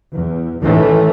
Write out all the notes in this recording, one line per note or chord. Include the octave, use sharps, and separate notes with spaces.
E2
G#2 D#3 E3 A3 C#4